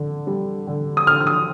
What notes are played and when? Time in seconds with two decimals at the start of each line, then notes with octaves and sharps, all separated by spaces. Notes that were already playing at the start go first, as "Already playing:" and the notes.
Already playing: D3
0.27 G3
0.67 D3
0.97 D#6
1.07 D3 F6
1.20 F6
1.27 D#6